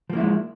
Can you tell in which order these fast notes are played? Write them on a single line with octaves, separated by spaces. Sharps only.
F3 A#3 E4 G#3